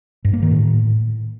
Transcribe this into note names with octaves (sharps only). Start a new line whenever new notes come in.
G2
A#3
D#3
A2